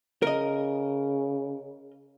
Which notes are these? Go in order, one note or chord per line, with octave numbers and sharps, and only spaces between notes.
C#3 A#4 D#5